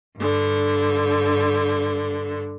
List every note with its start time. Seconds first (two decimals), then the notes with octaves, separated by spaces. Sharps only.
0.17 G2 D3